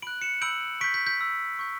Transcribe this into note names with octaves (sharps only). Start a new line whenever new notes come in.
B5 F#6 D7 F#7
C#7 E7
B5 E6 G6 D7 F#7
C#6 G6 B6 D7
G6 B6
G6 B6
B5 E6 G6
C#6 G6